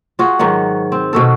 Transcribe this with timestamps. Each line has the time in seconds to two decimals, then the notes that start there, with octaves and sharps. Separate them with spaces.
0.19 F4 F#4 G#4
0.39 G#2 D#3 F#3 F#5
0.92 C4
1.13 B2 F#4 A4